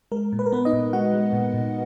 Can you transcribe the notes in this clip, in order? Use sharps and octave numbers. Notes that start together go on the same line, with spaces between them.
G#3 A#4
A#2
B4
A#4
A#2 B3 B4
D#4 D#5
A#2
G#3 F#4 F#5
G#3
A#2
A#2